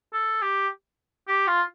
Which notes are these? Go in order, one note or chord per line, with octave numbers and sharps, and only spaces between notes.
A4
G4
G4
F4